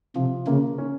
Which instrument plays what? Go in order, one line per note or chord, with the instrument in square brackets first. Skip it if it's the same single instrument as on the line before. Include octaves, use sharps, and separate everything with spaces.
[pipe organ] C3 [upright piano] F3
[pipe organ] C#3 [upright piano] A#3
[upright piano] C#4